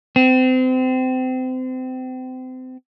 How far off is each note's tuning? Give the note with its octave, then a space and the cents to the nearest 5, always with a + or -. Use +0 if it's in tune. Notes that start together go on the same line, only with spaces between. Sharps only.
C4 -30